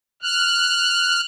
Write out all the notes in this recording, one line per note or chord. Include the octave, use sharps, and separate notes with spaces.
F6 F#6